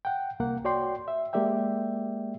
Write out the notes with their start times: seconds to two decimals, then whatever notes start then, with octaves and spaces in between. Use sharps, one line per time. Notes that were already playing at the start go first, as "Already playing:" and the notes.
0.05 F#5 G5
0.40 C2 A#3 F#5
0.65 F#4 C#5 D5 G5 C6
1.08 E5
1.33 G#3 A#3 G4 D5 E5 G5